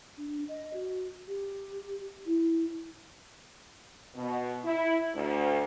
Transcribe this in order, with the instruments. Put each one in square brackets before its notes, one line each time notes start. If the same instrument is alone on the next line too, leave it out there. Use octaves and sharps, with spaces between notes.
[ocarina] D4
D#5
F#4
G4
E4
[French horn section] B2
E4
D2